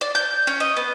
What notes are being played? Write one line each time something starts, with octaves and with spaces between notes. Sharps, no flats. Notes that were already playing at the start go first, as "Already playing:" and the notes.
D5
G6
C#4
D#5
B3